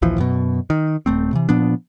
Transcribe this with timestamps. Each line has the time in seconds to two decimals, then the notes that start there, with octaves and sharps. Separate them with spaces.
0.02 A#1 D#2 E3 F3
0.18 F#2 B2
0.70 D#3
1.06 D#1 A3 C4
1.33 C3 E3
1.49 A#2 F3 B3 D4